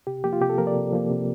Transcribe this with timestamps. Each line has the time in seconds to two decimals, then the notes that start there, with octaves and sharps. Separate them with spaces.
0.07 C3 G4
0.24 F3 A#3 G4
0.33 F4
0.41 C3 G4
0.50 A4
0.58 F3 A#3 A#4
0.67 D5
0.76 C3
0.92 F3 A#3
1.10 C3